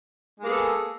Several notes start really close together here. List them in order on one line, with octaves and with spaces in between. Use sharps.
G#3 A#3 G#4 B3 A4